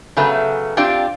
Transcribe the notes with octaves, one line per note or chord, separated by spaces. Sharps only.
C#3 F#3 A3 B3
C4 D4 F4 G4 D5